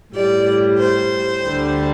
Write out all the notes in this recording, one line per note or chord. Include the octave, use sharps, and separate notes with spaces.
A2 G3 D5
C5
D2 D3 G3